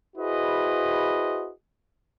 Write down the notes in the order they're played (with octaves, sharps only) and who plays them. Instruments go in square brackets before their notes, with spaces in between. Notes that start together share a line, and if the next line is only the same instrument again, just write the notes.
[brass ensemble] E4 F#4 G#4 B4 C5 D#5